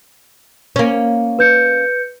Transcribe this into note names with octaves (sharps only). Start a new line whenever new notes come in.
A#3 C#4
B4 G6 C#7